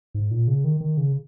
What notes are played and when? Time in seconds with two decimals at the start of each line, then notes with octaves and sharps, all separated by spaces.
0.15 G#2
0.31 A#2
0.47 C#3
0.64 D#3
0.81 D#3
0.97 C#3